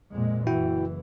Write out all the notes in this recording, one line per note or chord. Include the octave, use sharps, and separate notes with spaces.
F2 A#2 G#3
F#1 E3 E4 F#4 G5